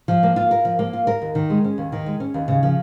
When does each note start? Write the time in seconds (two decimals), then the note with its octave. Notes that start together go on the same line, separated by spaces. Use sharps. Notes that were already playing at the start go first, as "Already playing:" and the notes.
0.08 F3
0.23 A#3
0.36 F4
0.51 A#4
0.65 F3
0.79 A#3
0.93 F4
1.07 A#4
1.22 D#2
1.35 D#3
1.50 G#3
1.64 C#4
1.78 D#2
1.92 D#3
2.06 G#3
2.20 C#4
2.34 D#2
2.48 C#3
2.63 F3